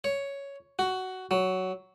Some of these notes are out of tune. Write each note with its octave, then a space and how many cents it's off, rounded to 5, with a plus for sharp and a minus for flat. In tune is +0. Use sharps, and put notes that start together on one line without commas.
C#5 +5
F#4 +10
F#3 +10